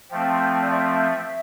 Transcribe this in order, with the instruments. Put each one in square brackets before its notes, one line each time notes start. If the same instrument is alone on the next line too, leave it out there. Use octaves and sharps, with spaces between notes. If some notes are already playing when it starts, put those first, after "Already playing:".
[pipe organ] F3 A3 C4 [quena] G5
[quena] D5
E5